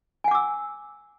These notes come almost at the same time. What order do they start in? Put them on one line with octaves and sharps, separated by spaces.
G#5 F#5 D6 E6